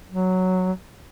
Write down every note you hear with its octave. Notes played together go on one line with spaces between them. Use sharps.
F#3